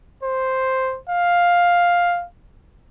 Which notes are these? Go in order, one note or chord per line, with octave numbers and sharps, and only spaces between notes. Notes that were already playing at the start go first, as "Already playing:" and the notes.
C5
F5